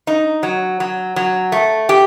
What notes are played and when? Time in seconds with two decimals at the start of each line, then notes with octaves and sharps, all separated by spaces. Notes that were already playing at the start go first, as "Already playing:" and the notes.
0.07 D#4
0.43 F#3
0.80 F#3
1.16 F#3
1.52 A3
1.89 G4